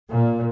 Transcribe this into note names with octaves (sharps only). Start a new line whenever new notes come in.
A#2